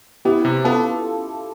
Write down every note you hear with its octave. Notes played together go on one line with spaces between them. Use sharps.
B3 E4 G4
C3
B3 F4 A4